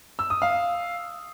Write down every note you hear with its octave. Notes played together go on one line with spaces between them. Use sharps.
E6
D#6
F5